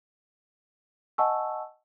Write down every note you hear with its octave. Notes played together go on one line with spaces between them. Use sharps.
D#5 F#5 G#5 A5 C#6 E6